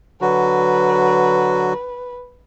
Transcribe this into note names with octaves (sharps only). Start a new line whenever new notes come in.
D3 F#3 F#4 B4